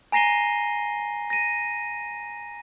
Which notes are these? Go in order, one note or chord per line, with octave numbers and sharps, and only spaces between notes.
G#5 A#5 A#6 C7 D#7 G7
A#6 D#7